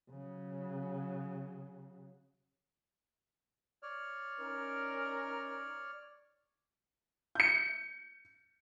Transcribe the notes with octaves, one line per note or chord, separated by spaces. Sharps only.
C#3 F#3
C#5 D5 F6
C#4 D#4 A#4
G6 C#7